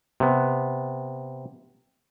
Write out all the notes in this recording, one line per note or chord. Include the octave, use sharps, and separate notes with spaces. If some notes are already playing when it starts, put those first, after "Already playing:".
C3 B3